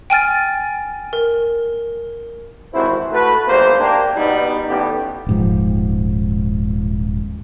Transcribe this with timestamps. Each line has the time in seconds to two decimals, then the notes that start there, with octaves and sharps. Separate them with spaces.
0.10 G5 G#5 F6 A6
1.13 A#4
2.73 G#1 C3 E3 E4 F#4 C5
3.12 A3 F#4 B4
3.48 G#1 E2 C3 A#3 C5
3.79 A#3 D4 G4
4.16 B2 G3 B3 D#4
4.67 A1 B3 G4
5.27 D#1 G#2 F3